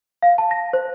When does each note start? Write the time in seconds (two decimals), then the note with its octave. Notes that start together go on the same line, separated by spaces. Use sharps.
0.22 F5
0.38 A5
0.51 A#6
0.73 C5